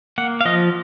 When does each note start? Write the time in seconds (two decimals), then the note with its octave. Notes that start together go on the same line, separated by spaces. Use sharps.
0.18 A#3 F#5
0.41 F5
0.45 F3 D#5